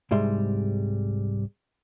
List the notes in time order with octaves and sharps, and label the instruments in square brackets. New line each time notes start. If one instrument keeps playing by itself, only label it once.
[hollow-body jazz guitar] C2 G#2 G3 G#3 E5 C6